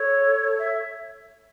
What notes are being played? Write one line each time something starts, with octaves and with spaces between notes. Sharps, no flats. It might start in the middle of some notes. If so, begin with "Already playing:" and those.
Already playing: A4 C#5
E5